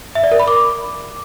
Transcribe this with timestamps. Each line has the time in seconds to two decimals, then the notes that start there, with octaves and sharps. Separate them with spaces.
0.15 E5
0.23 D5
0.31 A#4
0.40 B5
0.48 D6